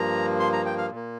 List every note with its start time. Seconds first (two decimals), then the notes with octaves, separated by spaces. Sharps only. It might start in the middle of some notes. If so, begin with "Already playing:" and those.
Already playing: G2 F3 A#3 A#5
0.40 C6
0.53 A#5
0.66 G5
0.78 F5
0.90 A#2
0.95 A#3